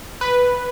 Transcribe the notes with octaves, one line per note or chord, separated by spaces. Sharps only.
B4